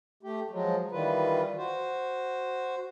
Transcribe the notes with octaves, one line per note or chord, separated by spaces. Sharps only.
A3 G4
F3 F#3 G#3
D#3 E3 G3 F4 B4
F#4 C5